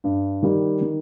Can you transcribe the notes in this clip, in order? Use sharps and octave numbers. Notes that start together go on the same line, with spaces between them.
G2
D#3 G3
D#3